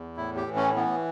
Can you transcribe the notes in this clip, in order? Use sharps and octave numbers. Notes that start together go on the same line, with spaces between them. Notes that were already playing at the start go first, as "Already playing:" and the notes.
Already playing: E2
A2 E4
G4
E3
C#4
E3 B3